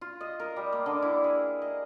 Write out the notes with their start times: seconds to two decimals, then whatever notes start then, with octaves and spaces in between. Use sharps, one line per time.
0.01 F4
0.21 D#5
0.40 A#4
0.56 G3
0.72 A#3
0.86 D3
1.02 E4
1.24 G#4
1.62 D#5